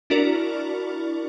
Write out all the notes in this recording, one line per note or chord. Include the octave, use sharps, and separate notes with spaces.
D4 E4 F#4 A#4 D5